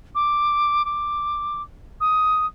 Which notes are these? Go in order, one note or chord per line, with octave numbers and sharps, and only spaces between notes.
D6
D6
D#6